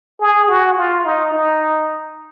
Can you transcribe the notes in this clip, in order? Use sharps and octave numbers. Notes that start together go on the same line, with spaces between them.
G#4
F#4
F4
D#4
D#4